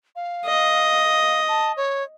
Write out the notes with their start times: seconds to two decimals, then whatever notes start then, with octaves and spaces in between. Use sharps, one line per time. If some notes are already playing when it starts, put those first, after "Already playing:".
0.16 F5
0.46 D#5
1.48 A5
1.77 C#5